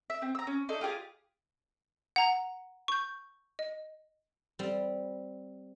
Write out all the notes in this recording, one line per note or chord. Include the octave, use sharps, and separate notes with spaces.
E5
C4
A#5 E6
C#4
D4 D#4 A4
F4 G4 G#4 F5
F#5 A#5
C#6 G6
D#5
G3 C4